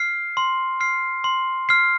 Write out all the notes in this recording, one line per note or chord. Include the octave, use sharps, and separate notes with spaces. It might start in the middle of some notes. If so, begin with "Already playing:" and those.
Already playing: F6 C7
C6
F6 C7
C6
F6 C7